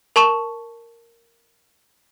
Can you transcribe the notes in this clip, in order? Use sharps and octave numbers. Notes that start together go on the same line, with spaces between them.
A#4 A5 C#6 E7